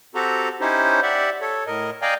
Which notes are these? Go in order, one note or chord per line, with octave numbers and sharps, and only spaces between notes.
C4 F#4 G4 A4 A#5
C#4 D#4 E4 G4 C5 C#5
G4 D5 E5 F#5
A4 C#5
A2 A#4 D#5
D5 D#5 F5 G5 G#5 A#5